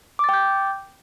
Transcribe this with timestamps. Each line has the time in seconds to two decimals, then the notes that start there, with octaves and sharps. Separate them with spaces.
0.19 D6
0.24 A6
0.29 G5
0.33 G6